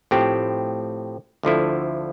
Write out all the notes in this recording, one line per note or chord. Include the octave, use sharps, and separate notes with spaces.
A2 F3 C4 G4
D2 D3 F3 A3 E4